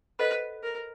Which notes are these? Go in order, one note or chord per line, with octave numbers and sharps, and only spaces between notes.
A4 B4 C5 D#5 F#5 B5
A#4